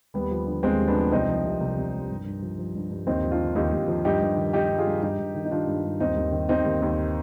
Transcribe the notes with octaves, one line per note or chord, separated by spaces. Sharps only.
D#2 G3 B3
F3
D3
D#2 G#3 C4
D#2
B3 D4
F3
C2 C4 D#4
F3
C3
C2
C2
F3
G2
G2
F3
F3
G2
G2
D#2 C4 D#4
F3
D4 F4
D3
D#2 D#4 G4
D#2
F3
G2 D#4 G4
G2
D#3
D#3 D#4 G4
G2
F4 G#4
G2
G2 D#4 G4
G2
D#3
D#4
D#3 D4 F4
G2
G2
D#2 C4 D#4
D#2
D#3
D#3 C4 D#4
D#2
D#2